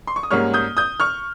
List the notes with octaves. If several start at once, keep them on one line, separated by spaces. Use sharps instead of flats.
C6
C#6
D#6
G#2 G3 A#3 C#4 C#6 F6
D#6 G6
D#6 G6
C#6 F6